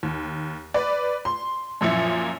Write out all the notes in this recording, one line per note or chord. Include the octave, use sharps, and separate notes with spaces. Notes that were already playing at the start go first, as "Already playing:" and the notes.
D#2
B4 D5
C6
F#2 A#2 F3 E4 C#7